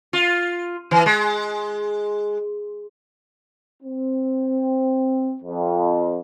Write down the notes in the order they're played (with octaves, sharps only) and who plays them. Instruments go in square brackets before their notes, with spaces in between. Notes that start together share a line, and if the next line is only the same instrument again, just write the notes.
[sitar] F4
E3
G#3
[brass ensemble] C4
F2